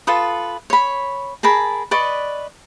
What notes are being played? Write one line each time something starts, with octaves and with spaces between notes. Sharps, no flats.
F4 A4 B4 D#6
C#5 B5
G#4 A#4 A5 B5
B4 D5 D#5 C#6